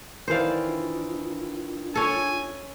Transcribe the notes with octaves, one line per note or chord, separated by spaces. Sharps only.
D#3 E3 C5 D5 F5
D4 F4
C#4 A4 G#5